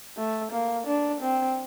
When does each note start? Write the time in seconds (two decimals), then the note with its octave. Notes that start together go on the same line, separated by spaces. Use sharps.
0.17 A3
0.52 A#3
0.87 D4
1.21 C4